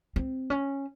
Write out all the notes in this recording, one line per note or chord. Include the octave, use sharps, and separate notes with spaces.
C4
C#4